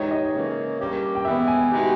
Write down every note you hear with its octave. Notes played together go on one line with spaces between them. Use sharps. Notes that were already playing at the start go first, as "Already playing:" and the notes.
Already playing: G#2 E3 G#3 D#4 G4 C#5
D#5
C#3 E3 A#3 C#4
G2 G3 A#3 C#4 G4
G5
E3 G#3 B3 E5
G#5
B2 G#3 D#4 G4